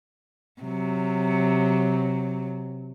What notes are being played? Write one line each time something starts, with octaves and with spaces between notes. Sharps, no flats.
C3 F#3